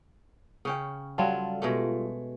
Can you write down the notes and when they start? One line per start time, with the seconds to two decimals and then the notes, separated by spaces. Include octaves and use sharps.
0.65 C#3 C#4 G5
1.18 F#3 G3 F4 A4
1.62 B2 G#3 A3